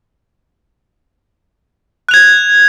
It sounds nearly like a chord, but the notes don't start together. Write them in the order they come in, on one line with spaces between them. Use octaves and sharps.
F#6 F7 G#6